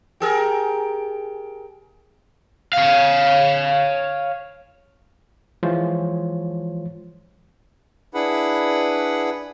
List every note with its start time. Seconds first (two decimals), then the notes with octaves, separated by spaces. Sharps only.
0.20 G4 G#4 A#4
2.73 C#5 F5
5.63 E3 F3 G#3 F4 C5 C#5
8.14 D4 E4 G#4 B4 F#5 B5